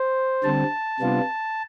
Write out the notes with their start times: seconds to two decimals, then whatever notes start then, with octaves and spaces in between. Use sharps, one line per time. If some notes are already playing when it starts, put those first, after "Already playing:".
Already playing: C5
0.44 D3 G3 C4 A5
1.00 C3 G3 B3 D4 F4